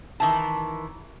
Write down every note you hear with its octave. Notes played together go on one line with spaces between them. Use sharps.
D#3 E3 A5